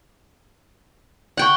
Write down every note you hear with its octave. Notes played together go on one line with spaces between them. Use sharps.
D5 F#5 G5 C#6